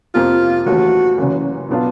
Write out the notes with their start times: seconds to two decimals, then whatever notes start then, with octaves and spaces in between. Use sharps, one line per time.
0.15 F2 C3 F3 A#3 F4
0.66 D#2 C#3 E3 A3 C#4 F#4
1.18 F#1 F#2 C#3 E3
1.69 B2 F#3 B3 D4 F4